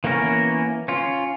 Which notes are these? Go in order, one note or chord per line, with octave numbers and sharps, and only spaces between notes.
E3 A#3 B3 C#4 A#4
C#4 F4